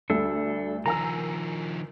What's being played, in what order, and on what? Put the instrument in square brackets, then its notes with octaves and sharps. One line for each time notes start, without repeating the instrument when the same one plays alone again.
[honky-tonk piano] D2 G3 [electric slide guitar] D4 A4
[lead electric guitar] D#3 F3 [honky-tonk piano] A#4 G#5 E6 [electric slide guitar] A#5